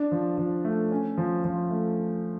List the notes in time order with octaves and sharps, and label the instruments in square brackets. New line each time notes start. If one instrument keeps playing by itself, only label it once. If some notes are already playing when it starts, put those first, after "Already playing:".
Already playing: [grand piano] D4
F3
F3
A3
C#4
F3
F3
A3